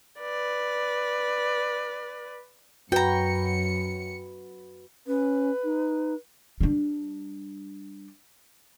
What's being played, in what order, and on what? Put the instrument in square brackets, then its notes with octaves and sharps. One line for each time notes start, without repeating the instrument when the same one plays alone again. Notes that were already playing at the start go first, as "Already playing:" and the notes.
[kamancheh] B4 D5
[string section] F#2 C#7 [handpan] F#4 B4 [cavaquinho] G5 A#5
[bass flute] C#4 [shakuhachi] B4
[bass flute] D#4
[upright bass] G3 D4